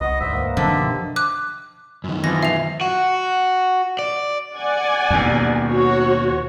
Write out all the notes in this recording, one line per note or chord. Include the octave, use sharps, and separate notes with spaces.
C2 B4 D#5 F#5 C#6
D2 G#2 C5 D5 E5 F#5
A#3 D#5
F#2 D3 F3 F#3 D#4 E5
B2 F3 G4
D6 F#6
F#2 D#3
E3 F3 A#6
E5 C7 F7
F#4
D5
D5 F#5 G#5
D#2 B2
F#4 C#5